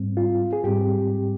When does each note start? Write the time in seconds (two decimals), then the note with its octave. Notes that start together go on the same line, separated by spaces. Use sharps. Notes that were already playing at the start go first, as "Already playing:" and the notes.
Already playing: G#2 G3 C4
0.17 F4
0.53 G#4
0.64 G#2 G3 C4 G4